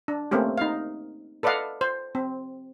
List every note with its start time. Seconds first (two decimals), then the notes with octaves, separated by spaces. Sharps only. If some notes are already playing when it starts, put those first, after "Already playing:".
0.08 D4
0.31 A3 A#3 C4 C#4 G4
0.58 D#4 F5
1.43 A4 B4 D5 D#5 F5 F#5
1.81 C5
2.15 C4